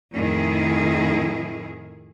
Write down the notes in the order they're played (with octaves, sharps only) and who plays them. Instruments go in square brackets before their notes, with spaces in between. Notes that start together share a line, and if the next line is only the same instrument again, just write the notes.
[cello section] F2 A2 D#3 E4 G#4